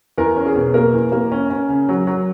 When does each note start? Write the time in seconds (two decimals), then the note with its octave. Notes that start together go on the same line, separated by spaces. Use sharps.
0.18 E2 A#4
0.36 C#4
0.46 G#4
0.56 B2
0.74 A#3 A#4
0.93 E2
1.12 A#3
1.32 C#4
1.50 C#4
1.69 C#3
1.89 F#3
2.07 F#3